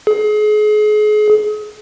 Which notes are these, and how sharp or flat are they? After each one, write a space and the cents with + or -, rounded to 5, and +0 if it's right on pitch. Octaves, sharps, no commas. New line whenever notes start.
G#4 +35